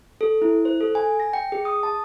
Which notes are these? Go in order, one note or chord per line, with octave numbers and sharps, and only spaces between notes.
A4
E4
C5
A4
G#5
A#6
G5
G#4
D#6
A5